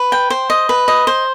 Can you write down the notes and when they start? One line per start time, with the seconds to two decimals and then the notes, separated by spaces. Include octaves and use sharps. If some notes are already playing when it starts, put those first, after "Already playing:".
Already playing: B4
0.12 G5
0.30 C5
0.50 D#5
0.69 B4
0.88 D#5
1.07 C5